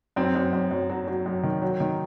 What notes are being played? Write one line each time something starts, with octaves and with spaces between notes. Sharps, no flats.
F#2 C4
F#2
F#2
F#2
F#3
F#3
F#2
D#3
F#3
D#3